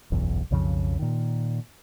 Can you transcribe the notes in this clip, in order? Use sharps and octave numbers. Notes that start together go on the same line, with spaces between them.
F#1 B1 E2
B1 F2 C#3 F3
A#2 D#3